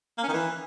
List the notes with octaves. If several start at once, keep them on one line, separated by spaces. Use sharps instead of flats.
A#3
C#4
D#3
E3